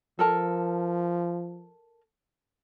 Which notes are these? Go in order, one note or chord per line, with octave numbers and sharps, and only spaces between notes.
F3 A4 A#4 A5